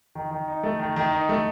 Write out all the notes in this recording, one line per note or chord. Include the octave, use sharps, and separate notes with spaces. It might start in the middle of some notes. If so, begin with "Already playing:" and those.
D#3
D#3
D#4
A3
D#3
D#3
D#4
A3